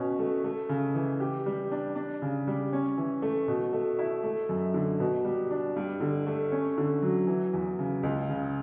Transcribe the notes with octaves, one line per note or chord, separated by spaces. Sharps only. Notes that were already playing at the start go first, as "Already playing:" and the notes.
Already playing: B2 C#4
A3
A3
C#3
E3
G4
G3
D4
D4
C#3
G3
C#4
E3
A3
B2
A3
E4
A3
F#2
D3
B2
G3
D4
G2
D3
A3
C#4
D3
F#3
E3
E2
C#3
C#2
C#3